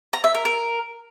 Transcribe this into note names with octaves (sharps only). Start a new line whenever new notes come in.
A#5
E5
A#4
A#4